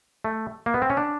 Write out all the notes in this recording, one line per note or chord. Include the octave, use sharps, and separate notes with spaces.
A3
A#3
B3
C4
C#4
D4